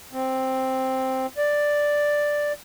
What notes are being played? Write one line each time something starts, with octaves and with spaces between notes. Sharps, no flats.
C4
D5